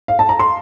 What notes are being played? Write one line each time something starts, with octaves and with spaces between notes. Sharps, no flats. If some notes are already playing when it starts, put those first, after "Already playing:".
F5
A5
A#5
C6